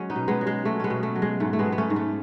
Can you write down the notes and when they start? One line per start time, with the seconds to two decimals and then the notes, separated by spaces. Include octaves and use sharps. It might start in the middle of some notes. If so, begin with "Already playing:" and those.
Already playing: F#3 G#3 C#4
0.10 B3 D#4
0.16 B2
0.28 G#3 B3
0.41 F#3
0.47 G#3
0.65 F#3 A3
0.80 G#3 B3 C#4
0.90 B2
1.03 A3
1.15 F#3
1.22 G#3
1.40 G#2 A3
1.53 A3
1.59 G#3 B3
1.65 F#3
1.72 B3
1.78 A3 C#4
1.90 G#2
1.96 A3